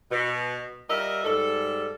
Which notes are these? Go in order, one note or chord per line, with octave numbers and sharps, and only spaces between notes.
B2
G3 F4 A#4 D#5 E5
G#2 G3 A4